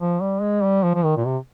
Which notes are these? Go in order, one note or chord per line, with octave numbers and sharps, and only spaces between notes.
F3
G3
G#3
G3
F3
F3
D#3
A#2
C3